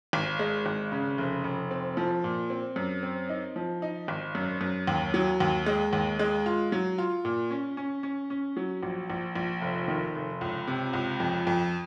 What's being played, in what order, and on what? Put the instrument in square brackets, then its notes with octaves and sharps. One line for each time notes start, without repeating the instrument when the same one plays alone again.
[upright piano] G#1
G#3
G#1
C#3
F1
F1
C4
F3
A#2
C4
F#2
C4
D#4
F3
D#4
G#1
F#2
F#2
D#2
F#3
D#2
G#3
D#2
G#3
F4
F#3
F4
A#2
C#4
C#4
C#4
C#4
F#3
A#1
A#1
A#1
F1
D#3
F1
C#2
C3
C#2
F2
F2